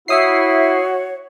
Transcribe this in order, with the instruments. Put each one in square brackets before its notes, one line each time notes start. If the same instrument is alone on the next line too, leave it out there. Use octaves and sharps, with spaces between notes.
[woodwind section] E4 [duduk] F#4 [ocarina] C#5 [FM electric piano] E5 D#6 C7